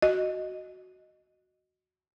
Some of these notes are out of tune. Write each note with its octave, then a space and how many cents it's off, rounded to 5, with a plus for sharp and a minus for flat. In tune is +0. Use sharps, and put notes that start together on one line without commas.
F#4 +0 D#5 +0